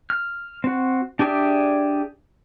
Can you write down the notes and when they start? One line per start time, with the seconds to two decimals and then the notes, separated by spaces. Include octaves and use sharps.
0.10 F6
0.64 C4 F#4
1.19 D4 G4 G#4 D5 E5